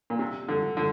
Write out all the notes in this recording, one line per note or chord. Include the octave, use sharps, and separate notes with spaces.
A#2
C3
D3
D3